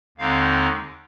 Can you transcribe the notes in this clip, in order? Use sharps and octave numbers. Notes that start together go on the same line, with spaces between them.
D#2 D3 G#3 C4 D#4 F5